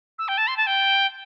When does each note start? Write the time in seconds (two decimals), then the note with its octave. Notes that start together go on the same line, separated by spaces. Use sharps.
0.19 E6
0.28 G5
0.38 A5
0.47 C6
0.57 A5
0.67 G5